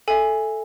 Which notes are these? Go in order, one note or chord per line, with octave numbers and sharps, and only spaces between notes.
A4 E5 G#5